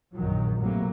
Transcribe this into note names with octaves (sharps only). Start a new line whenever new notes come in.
A#1 F#2 D#3 F#3
A2 C3 F#3 A#3